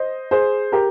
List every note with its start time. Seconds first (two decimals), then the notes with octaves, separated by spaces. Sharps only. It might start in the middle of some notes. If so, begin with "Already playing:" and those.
Already playing: C5 D#5
0.31 G#4 C5
0.72 G4 A#4